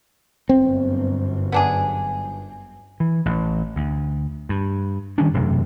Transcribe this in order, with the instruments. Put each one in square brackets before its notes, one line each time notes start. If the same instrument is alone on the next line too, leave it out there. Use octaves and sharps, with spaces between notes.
[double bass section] G1 F#2 [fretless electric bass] C4
[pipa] B3 D4 G#4
[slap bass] E3
A1
D2
G2
D#3 G3 C#4 D4
E1 F#2 C3 A3